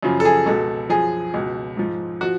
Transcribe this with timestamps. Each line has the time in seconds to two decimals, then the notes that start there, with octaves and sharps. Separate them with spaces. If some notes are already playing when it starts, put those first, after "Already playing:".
0.03 F#2 C#3 F3
0.20 A4
0.25 G#4
0.46 C#2 B2 A4
0.90 F#2 F3 G#4
1.34 C#2 B2
1.77 G#2 F3
2.21 F3 F#4